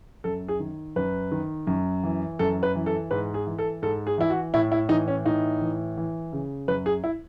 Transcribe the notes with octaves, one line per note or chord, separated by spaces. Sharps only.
F#2 A4
G#4
D#3
F#2 B4
D#3
F#2
E3
F#2 A4
B4
E3
A4
G#2 B4
G#4
E3
A4
G#2 A4
G#4
E3 E4
F#4
A2 E4
E4
E3 D#4
C#4
A2 D#4
E3
E3
C#3
F#2 B4
G#4
E4